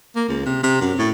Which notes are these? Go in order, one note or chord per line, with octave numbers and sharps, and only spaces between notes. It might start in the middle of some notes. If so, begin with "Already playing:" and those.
A#3
C#2
C3
C3
F#2
A2